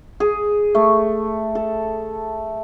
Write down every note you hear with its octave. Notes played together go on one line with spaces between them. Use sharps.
G#4
A3
A4